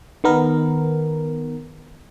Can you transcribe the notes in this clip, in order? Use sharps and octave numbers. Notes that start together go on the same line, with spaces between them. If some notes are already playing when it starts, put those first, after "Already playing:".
D#3 B3 A#4